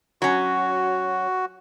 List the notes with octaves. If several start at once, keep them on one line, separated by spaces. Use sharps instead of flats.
F#3 C#4 F#4